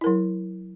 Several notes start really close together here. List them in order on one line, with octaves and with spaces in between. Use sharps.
E4 A#4 F#3